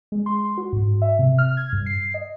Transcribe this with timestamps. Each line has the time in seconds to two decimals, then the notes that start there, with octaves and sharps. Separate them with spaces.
0.12 G#3
0.26 C6
0.57 F#4
0.73 G#2
1.02 E5
1.19 C3
1.38 F6
1.57 G#6
1.73 G2
1.86 C7
2.14 D#5